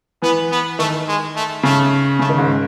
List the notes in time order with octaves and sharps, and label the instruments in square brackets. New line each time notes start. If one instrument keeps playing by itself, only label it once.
[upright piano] E3 [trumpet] B3
[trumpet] B3
[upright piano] D#3 [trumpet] A3
[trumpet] G#3
A3
[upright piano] C#3 [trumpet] A3
[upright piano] C#3 [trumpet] A3
[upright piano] D#3
G#2